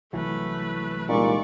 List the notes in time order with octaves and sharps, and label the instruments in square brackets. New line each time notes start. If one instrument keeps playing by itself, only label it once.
[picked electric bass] C2 E3 F#3 [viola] A3 B4
[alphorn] A#2 [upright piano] G3 G#3 D#4 [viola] D5 C#6